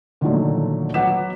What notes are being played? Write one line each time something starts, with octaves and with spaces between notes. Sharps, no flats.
A#2 D3 D#3 F3 F#3 A3
F#3 B4 F#5 D6 B6 E7